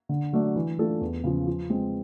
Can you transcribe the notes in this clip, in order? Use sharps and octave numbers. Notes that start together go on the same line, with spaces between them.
D3
F#3 A3 D4
E3
A3 D4 F4 A4
E2
C#3 F3
F3
G#3 C4